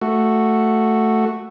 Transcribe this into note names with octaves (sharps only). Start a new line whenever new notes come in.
A3 F#4